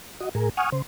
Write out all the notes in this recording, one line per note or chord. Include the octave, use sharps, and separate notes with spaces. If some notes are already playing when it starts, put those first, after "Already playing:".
F#4 D#5
A2 G#4 A#4
F#5 G#5 C#6 D#6 F6
C#3 C5